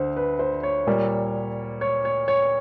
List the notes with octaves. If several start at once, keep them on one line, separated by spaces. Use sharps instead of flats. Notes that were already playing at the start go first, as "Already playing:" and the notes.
Already playing: D2 D3 C5
B4
C5
C#5
A#2 G3 A#3
C#5
C#5
C#5